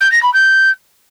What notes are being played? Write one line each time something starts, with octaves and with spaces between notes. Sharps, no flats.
G6
A#6
B5
G6